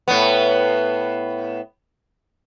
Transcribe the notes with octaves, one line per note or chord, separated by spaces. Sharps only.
A2 B3